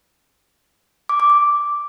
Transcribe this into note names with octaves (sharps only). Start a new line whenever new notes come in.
D6
D6
D6